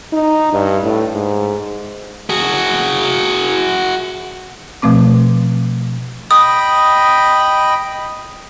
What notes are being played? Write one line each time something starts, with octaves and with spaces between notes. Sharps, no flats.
D#4
G2
A2
G#2
F#4 G#4
B2 F3 A3 C4 D6
D#5 G5 B5 D#6